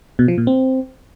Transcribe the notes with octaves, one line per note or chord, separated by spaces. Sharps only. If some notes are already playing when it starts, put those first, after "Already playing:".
B2
F3
A#2
C4